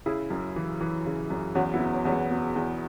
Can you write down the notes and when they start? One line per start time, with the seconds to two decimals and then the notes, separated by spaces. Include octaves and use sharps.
0.06 C#3 E4 G#4
0.30 F#2
0.56 E3
0.81 E3
1.06 C#3
1.30 F#2
1.55 E2 C#4 F#4
1.74 B3 E4
1.80 B2
1.94 C#4
2.05 E2 C#4
2.12 B3
2.31 B2
2.56 E2